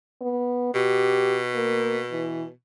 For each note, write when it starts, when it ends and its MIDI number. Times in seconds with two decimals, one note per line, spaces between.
0.22 0.72 59
0.75 2.51 47
0.75 1.41 67
1.55 2.00 58
2.11 2.44 52